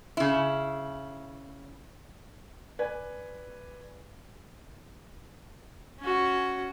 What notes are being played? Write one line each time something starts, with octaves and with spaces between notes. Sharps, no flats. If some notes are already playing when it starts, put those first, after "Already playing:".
C#3 E4
B4 D5 G#5
C#4 F#4